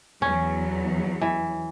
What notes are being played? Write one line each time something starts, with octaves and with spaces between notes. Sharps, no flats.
E2 F#3 C#4
E3